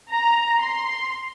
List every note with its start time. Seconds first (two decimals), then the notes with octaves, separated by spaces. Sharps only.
0.12 A#5
0.61 C6